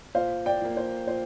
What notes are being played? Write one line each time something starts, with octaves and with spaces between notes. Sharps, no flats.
A#2 C5 F5
D5 G5
F3 A#3
C5
A#2 C5